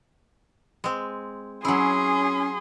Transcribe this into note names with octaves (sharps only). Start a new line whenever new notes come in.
G#3 C4
F#3 C#4 E4 G#4 C6